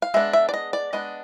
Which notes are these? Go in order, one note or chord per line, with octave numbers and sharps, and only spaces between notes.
F5
G#3 B3 D4 E5
E5
D5
D#5
D5
G#3 B3 D4 D#5